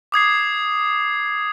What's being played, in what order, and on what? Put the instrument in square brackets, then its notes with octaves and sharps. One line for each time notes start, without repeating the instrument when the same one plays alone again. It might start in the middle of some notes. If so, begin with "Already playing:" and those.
[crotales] D6 D#6 G#6 C7